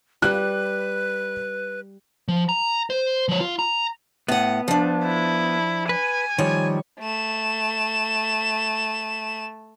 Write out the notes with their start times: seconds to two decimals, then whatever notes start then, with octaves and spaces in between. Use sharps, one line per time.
0.22 G3 B4 F#6
2.28 F3
2.49 A#5
2.90 C5
3.28 F3 C#5
3.40 F4
3.59 A#5
4.28 A2 B3 F#5
4.68 F3 D4
5.05 E4
5.89 B4 G#5
6.38 D#3 F3 G3 C#5
7.00 A3 E7